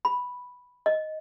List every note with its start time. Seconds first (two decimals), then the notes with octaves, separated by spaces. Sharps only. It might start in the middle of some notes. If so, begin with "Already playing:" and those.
0.05 B5
0.86 D#5